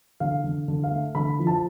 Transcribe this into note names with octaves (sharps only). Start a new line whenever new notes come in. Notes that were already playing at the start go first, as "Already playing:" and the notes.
D3 F5
D3
D3
F5
A3
D3 B5
F3
A5